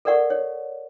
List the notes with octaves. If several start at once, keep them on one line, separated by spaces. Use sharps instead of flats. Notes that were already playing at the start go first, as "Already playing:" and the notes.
A4 A#4 D5 F#5 C#6
C#5